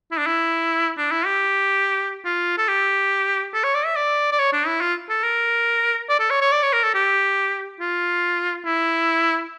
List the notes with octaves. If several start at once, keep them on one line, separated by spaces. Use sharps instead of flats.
E4
D4
E4
D4
E4
G4
F4
A4
G4
A4
C#5
D5
E5
D5
D5
C#5
D4
E4
F4
A4
A#4
D5
A4
C#5
C#5
D5
C#5
A#4
A4
G4
F4
E4